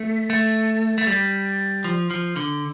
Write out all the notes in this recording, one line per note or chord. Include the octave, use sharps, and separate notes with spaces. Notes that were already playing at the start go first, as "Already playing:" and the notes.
Already playing: A3
A3
A3
G3
F3
F3
D3